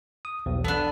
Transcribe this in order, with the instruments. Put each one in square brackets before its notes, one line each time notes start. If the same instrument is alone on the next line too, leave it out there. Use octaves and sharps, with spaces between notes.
[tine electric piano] D#6
B1 E2
[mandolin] B3 D4 [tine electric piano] A4